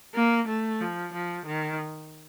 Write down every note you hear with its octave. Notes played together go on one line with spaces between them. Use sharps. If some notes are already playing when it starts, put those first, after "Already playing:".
A#3
A3
F3
F3
D#3